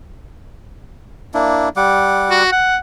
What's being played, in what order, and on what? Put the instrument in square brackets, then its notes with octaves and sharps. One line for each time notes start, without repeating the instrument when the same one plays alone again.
[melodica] A#3 D4 E4
G3 F#5 D6
[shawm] F#4
F#5